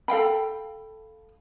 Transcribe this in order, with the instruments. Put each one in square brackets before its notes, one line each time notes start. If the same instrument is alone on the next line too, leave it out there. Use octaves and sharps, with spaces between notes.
[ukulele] A4 F5 G5 B5